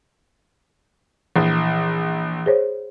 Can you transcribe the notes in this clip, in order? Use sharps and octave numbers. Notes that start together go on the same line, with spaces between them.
A#1 E3
G#4 C5 C#5